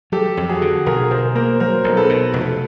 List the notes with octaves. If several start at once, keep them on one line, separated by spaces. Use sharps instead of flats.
F#3 G4 A4
F2
F#4 G#4
D3
B1 G#4 A#4
B2 A#4 C5
A#3 A#4 C5
F#3 A#4 C5
B1
A4 B4
B2
F1